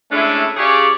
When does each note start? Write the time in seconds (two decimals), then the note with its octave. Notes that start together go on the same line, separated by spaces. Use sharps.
0.11 G#3 A3 C#4 D4 E4
0.56 C#3 F4 G4 G#4 C#5 D5